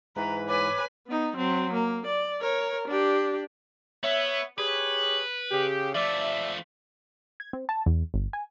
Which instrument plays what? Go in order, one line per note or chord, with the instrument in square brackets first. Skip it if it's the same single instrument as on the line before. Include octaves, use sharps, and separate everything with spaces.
[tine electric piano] G#2 E3 [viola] B4 [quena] A#5
[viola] B4 G#5 [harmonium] C#5 [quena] D6
[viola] B3 D#4
F#3 C4
A#3
D5
A#4 C#5
D4 G4
[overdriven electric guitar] B3 [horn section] C#5 E5
[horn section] G4 G#4 C#5 [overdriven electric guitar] B4
[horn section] C#3 G4
[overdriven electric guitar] F3 A3 [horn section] D5 E5
[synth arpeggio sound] G#6
C4
A5
E2
G1
G#5